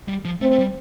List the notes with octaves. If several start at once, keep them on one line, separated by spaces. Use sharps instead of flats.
G3
F3
A3 C4
A3
G3